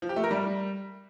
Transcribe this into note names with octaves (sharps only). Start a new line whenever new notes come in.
F3
G4
A3
A#4
G3